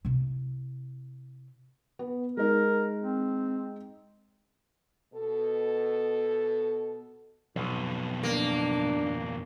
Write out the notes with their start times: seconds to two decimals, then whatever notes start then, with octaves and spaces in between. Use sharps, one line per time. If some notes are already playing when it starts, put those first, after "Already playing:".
0.05 C3 E4
1.99 B3
2.37 G#3 D#4 A#4
2.99 C4
5.14 B2 A4
7.56 B1 F2 B2
8.23 A#3 D4